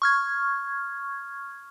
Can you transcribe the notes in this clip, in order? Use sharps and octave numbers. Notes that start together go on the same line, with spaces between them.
C#6 F6 G#6